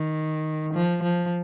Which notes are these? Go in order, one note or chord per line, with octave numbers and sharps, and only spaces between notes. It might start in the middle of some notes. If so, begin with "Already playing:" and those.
Already playing: D#3
F3
F3